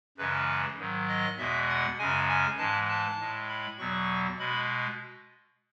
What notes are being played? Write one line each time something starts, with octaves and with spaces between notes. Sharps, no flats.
F#2 C#3 E3 G#3 B4
G#2 D#3 F#3
D#5
E2 B2 G#3 E5
F#5
F#2 C#3 G#3 G#5
G#5
G#2 E3 G#3 A5
A5
A2 G#3
B5
E2 B2 F#3 C#6
B2 G#3 B5